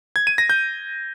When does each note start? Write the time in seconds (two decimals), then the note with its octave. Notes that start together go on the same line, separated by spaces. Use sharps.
0.16 G#6
0.27 D#7
0.38 A#6
0.50 G6